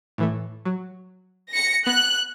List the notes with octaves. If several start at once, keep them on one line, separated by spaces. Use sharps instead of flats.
A2 E3 A3
F#3
A#6 C#7
B3 F#6